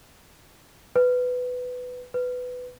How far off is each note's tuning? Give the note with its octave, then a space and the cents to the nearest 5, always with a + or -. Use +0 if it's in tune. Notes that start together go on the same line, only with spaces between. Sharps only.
B4 +10
B4 +10